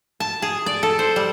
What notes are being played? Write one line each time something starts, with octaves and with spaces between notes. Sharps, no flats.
A5
G#4
D5
A4
C5
G3